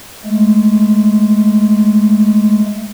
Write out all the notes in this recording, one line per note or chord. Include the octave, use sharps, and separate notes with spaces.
G#3 A3